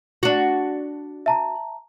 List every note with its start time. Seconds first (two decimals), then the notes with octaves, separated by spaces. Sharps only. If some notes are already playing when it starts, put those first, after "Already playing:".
0.23 D4 F#4
1.26 E5 A5 A#5